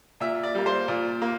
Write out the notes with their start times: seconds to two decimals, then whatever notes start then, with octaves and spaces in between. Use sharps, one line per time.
0.20 A#2 E5
0.43 D5
0.55 G3 A#3
0.66 C5
0.88 A#2
1.22 A#3